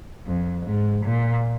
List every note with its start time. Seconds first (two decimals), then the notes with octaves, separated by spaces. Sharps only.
0.27 F2
0.66 G#2
1.05 A#2